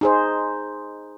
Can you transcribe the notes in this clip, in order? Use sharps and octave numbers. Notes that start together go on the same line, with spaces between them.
D#4 G#4 C5